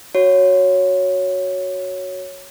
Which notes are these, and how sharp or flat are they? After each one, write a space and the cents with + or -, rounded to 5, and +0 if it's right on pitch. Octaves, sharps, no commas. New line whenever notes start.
F#4 +0 C#5 +0